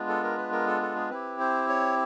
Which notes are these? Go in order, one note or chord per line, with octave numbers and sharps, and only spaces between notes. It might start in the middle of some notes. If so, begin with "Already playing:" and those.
Already playing: G#3 B3 D4 F4
A4
A#4
B4
A#4
A4
A4
G#4
C4 E4 G4 B4
C5
C#5